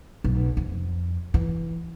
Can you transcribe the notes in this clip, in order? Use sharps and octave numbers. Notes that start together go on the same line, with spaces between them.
B1
F2
E3